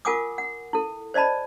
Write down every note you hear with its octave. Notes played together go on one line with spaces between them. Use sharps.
F4 A#4 F#5 G#5 D6 D#6
F#5
E4 A4
C5 D5 D#5 A5 B5